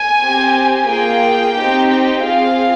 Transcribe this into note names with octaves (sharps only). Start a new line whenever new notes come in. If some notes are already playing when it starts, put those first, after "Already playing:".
Already playing: G#5
C4 G4
A#3 F4 G#4 G5
C4 D#4 G4
C4 F4 G#4 F5